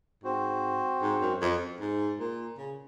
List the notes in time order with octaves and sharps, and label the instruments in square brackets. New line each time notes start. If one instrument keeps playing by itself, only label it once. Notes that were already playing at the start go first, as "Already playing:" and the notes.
[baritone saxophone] G#2 [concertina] C4 F#4 C5
[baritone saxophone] G#2
F#2
F2
G#2
A#2
C#3